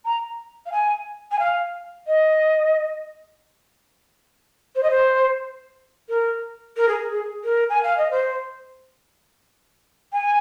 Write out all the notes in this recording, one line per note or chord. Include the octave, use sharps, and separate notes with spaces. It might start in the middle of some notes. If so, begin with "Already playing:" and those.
A#5
F5
G#5
G#5
F5
D#5
C5
D#5
C5
A#4
A#4
G#4
G#4
A#4
G#5
F5
D#5
C5
G#5